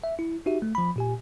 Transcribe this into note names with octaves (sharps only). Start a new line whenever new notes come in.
E5
E4
D#4 F#4 G4 E5
A3
F3 B5
A#2 G4 G#5